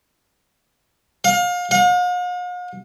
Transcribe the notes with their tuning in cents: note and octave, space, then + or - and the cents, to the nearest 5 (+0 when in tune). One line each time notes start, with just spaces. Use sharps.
F5 +30
F5 +45